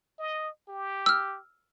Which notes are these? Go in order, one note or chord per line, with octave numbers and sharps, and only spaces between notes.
D#5
G4
E6 F6